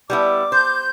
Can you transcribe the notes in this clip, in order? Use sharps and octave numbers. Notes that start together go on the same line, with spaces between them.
G3 B3 E4 D6
C5 G6